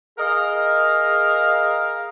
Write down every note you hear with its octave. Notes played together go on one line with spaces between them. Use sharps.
G#4 A#4 D#5 F5